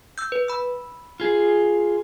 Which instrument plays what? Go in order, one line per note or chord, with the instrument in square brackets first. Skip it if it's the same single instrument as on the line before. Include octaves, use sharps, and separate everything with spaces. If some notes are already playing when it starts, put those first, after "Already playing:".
[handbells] E6 G6
B4
B5 E6
[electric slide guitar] F4 G#4